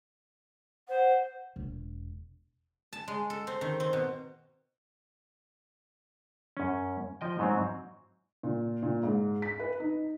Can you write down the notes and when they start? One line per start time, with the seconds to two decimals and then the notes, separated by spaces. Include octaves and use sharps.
0.89 C5 F#5
1.56 E1
2.93 A5
3.08 G#3
3.30 A4
3.47 C4
3.61 D#3
3.80 C4
3.93 B2
6.57 F#2 C#4
7.21 F3 D#5 G5
7.39 G#2 F#3 C4
8.43 A#2
8.83 A#2
9.03 G#2
9.42 B6
9.60 B4
9.80 D#4